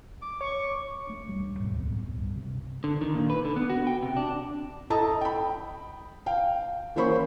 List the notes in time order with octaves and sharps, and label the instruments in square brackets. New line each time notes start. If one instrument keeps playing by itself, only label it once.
[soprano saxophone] D6
[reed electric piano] C#5 [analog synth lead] C#6
[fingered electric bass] A3 D4
D#1 E2 G3
D#2 G#2 B2 F#3
C2 A2 B3 C4
G2
C3
[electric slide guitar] D3
D#3
A#2
B4
D3
B3
F#4
G5
C3
D4
[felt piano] E4 A4 D#5 A5 A#5 D#6
G5 B5
F5 G5
E3 A#3 C#4 C5 B5 C#6